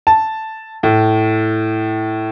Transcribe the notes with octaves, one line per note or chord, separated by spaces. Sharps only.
A5
A2